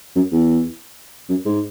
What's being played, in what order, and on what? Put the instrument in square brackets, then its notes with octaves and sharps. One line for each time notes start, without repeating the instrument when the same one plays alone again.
[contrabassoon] F#2
E2
F#2
G#2